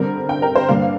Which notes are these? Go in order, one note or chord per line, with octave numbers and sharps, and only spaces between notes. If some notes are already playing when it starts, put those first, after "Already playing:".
Already playing: D3 G3 C4 A#4
G5
A#4
C5
G2 D3 A#3 D4 F5